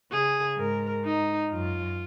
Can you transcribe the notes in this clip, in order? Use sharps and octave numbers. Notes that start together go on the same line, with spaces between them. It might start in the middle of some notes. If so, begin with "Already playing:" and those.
C#3 G#4
G#2 A#4
D#4
F#2 F4